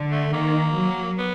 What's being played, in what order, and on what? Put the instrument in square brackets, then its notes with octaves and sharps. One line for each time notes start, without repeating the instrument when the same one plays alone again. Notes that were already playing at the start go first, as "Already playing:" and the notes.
Already playing: [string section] D3
[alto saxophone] A3
[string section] D#3 [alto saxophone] A#3
[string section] F#3
[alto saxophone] B3